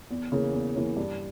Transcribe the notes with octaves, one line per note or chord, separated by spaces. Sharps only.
E2
C#3 E3 A#3 C#4
E2
C#3 E3 A#3 C#4
G2